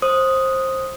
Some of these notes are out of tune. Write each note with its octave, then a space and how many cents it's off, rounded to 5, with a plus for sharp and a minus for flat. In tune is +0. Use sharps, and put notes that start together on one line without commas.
C5 +20 D#6 +0